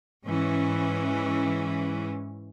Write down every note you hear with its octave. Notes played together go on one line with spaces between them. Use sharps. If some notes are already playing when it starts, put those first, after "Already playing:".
G#2 E3 C#4